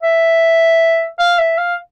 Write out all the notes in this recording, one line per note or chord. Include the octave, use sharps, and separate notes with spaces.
E5
F5
E5
F5